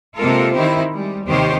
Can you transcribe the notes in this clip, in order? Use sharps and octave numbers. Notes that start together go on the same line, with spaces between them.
C3 G#3 A#3 F4 A4 A#4
D#3 C4 D#4 E4 G4 C5
G3 G#3
D#2 C3 D#3 G4 C5 C#5